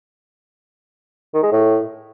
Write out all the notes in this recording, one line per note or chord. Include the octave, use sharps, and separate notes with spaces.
D#3
G#3
A2